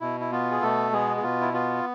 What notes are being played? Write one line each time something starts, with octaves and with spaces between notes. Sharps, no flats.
B2 E4
E4
B3 F4
G#4
B2 A3 A4
G#3 B3 G#4
G#4
B2 F4
E4
B3 F4